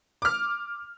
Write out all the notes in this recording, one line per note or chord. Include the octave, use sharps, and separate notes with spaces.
D6 F6